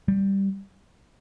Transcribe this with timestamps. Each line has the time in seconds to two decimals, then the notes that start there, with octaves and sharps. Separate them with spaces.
0.08 G3